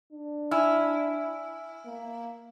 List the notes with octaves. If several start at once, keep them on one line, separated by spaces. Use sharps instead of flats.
D4
E4 G#5 E6 F6
A#3